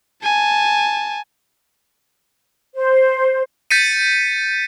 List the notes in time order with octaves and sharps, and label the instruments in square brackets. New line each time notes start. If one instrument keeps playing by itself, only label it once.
[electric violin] G#5 A5
[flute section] C5
[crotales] G6 A6 B6 C#7 D#7